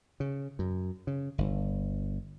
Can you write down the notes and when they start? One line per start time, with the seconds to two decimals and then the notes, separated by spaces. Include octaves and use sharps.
0.20 C#3
0.59 F#2
1.07 C#3
1.38 G1